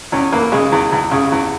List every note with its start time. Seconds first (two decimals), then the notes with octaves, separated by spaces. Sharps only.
0.12 E2 C#4
0.32 E3 A#3
0.52 C#3 G#3
0.72 E2
0.92 E2
1.11 C#3
1.32 E2